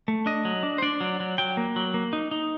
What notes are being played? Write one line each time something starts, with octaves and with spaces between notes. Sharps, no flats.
A3
D4 D#5
F#3
D4
C5
D4 D5
F#3
F#3
F#3 G5
A#3
F#3
A#3
D#4
D#4